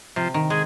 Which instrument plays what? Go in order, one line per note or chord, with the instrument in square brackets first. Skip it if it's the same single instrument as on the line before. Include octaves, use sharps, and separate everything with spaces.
[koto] C3 [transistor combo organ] F3
[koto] D#3
[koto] G#3 [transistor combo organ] G#4